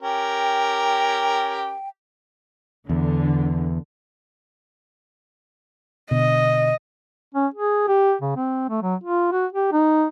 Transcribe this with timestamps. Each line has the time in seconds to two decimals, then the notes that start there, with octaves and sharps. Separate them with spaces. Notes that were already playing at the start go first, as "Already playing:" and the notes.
0.02 C#4 G4 A#4 G5
2.89 E2 D3
6.11 B2 D3 D#5
7.35 C#4
7.54 G#4
7.88 G4
8.21 C#3
8.36 C4
8.69 A3
8.82 F#3
9.04 F4
9.32 F#4
9.53 G4
9.72 D#4